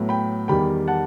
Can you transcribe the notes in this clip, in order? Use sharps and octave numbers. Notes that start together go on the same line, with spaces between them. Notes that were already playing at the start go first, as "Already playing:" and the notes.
Already playing: A2 F#3 B3
G5 B5
E2 D#3 G3 G5 B5
F#5 A5